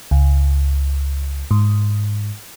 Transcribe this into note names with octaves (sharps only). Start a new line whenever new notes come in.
C#2
G#2